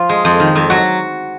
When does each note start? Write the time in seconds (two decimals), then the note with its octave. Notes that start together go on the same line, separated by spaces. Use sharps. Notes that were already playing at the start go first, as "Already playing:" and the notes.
Already playing: F3 F4
0.09 G#3
0.25 F2
0.40 D#3
0.56 F2
0.70 F#3 F#4